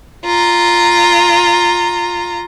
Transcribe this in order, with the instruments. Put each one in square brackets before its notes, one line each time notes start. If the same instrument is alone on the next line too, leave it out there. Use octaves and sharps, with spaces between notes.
[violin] F4 A#5